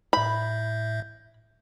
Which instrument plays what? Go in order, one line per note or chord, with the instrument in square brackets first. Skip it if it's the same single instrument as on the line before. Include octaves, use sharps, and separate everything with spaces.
[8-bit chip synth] A2 E5 G6 [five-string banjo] B5